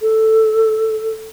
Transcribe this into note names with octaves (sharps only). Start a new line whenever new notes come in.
A4